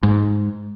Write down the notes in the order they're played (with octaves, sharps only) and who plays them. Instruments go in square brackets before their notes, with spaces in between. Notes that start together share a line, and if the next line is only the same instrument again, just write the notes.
[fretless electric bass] G#2